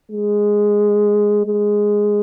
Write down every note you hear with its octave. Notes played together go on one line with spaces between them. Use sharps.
G#3
G#3